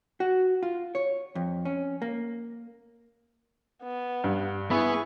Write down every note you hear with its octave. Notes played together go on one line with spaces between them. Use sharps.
F#4
F4
C#5
F2
C#4
A#3
B3
G2
B3 E4 G#4 C#6